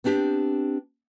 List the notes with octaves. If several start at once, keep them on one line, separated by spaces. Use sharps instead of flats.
B3 C4 D4 G4